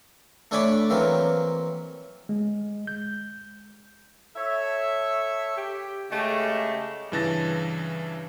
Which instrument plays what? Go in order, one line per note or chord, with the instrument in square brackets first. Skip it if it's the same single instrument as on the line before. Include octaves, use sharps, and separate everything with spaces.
[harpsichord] A3 D4 C#5 G#5 B5 D6
E3 F#3 A#3 C4
[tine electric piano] G#3
G6
[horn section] A4 C#5 E5
G4
C#3 G#3 A3 G4
[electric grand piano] G2 C#3 E3 A5 A6 A#6